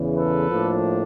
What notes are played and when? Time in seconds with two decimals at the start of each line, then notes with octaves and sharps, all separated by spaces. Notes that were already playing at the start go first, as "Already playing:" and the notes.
Already playing: E2 C#3 E3
0.17 A4 B4
0.50 A2 F3 A#3 D4